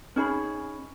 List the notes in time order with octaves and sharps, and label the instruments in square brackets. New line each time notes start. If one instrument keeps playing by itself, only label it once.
[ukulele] C#4 D#4 G#4 B5